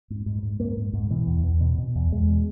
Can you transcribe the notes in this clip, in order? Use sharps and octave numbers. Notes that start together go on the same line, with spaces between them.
G#2
G#2
G#2
G#2 A#3
G#2
G#2
B2 E3
E2
E2
B2
B2
E2
E2 G#3
B2